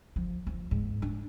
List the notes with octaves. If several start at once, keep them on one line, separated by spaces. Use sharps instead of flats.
F3
F3
G#2
D4